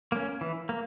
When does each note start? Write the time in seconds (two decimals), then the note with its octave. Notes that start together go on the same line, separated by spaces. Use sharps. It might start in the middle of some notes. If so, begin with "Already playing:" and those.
0.12 A#3 C#4
0.41 E3
0.69 A#3